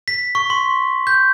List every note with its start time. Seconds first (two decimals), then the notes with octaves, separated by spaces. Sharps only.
0.08 B6
0.35 C#6
0.50 C6
1.07 G6